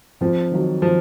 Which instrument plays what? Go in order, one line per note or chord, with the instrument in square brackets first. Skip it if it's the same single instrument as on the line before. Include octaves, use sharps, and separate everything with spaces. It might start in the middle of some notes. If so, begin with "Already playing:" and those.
[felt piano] F2 [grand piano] F3
[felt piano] D#3 F#3
[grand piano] F3